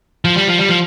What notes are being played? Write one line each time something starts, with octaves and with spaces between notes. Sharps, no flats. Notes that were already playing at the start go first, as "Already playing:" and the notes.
F3
G3
F3
G3
F3